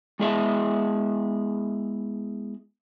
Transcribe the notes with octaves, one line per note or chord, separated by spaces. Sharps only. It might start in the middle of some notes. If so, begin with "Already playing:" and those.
G#3 B3 E4 G#4 D#5 E5